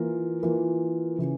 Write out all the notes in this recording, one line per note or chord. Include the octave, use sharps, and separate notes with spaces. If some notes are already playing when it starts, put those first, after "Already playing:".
Already playing: E3 A#3 F4 A#4
E3 A#3 F4 A#4
C#3 E3